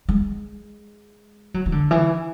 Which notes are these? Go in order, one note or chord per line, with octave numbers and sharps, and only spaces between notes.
G#3
F#3
E3
D3
E3